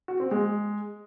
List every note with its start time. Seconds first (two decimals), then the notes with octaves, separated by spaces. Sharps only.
0.08 F#4
0.20 C4
0.31 G#3